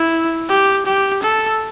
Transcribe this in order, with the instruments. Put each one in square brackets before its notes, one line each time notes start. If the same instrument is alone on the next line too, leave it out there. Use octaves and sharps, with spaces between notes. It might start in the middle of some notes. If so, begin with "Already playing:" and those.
Already playing: [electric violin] E4
G4
G4
A4